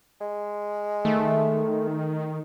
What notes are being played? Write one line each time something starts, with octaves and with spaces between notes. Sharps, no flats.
G#3
D#3 A3